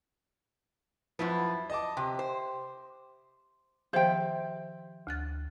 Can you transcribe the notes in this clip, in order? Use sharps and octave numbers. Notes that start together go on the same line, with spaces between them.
F#2 F3 E4 B4
D#5 A5 D6
C3 G4
C5
D#3 F3 G4 C5 E5 G5
D2 F#6 A6